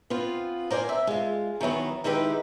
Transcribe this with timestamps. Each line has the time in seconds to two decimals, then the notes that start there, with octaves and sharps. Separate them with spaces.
0.10 B3 C4 F4
0.71 A#4 C5 D5 G5 G#5
0.89 E5
1.07 G#3 F4
1.61 D#3 E3 F#3 B3
2.04 D#3 G#3 D#4 E4 G4 B4